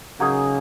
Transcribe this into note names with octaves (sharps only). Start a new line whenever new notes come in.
C#3 F#3 A#3 D#4 G#4